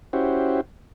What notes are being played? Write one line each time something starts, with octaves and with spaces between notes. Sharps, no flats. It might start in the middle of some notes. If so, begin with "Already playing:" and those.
C#4 E4 F#4 G4 C5